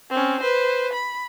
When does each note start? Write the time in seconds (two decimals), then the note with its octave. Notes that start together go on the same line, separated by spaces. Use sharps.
0.11 C4 C#4
0.40 B4 C5
0.93 B5